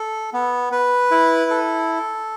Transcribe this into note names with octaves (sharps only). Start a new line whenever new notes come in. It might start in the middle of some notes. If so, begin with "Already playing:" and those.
Already playing: A4
B3
B4
E4
A4